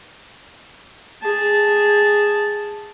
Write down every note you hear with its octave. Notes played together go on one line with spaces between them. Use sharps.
G#4 A5